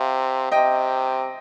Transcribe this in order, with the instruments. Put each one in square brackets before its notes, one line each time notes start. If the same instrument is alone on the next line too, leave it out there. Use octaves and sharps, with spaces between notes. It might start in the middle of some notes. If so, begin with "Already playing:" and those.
Already playing: [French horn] C3 [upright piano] F5
[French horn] C3 [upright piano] D#5 G5